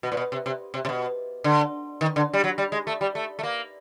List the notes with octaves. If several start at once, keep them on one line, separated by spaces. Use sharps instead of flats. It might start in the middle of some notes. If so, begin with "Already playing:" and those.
B2
A#2
B2
C3
C3
C3
C3
B2
D3
D#3
D3
G3
F#3
G3
G#3
A3
G3
A3
A3
A#3